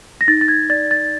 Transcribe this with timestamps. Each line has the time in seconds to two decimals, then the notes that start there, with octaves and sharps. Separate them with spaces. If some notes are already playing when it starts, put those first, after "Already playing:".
0.21 A#6
0.28 D#4 A6
0.41 A6
0.48 G#6
0.70 D5 A6
0.91 A6